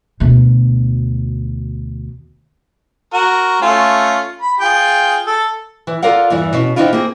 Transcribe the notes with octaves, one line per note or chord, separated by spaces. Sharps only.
D2 B2
F#4 A#4
A3 C#4 F4
B5
F4 G#4 G5
A4
E3
F4 A4 A#4 D5 F5 F#5
E2 G2 E3
B2 C#4
D#3 C4 D4 E4 F4
A#3 C4 G#4